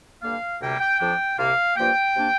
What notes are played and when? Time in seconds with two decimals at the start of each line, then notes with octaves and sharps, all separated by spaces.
0.21 G2 D3 A#3 F5
0.59 D2 C3 G3 A#3 G5
0.80 G5
0.99 F2 F3 D4 G5
1.38 C2 C3 A#3 F5
1.76 G2 F3 A#3 G5
2.14 C3 A#3 D4